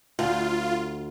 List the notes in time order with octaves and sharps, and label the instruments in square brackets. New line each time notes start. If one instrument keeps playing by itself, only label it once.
[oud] D2 [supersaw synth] F4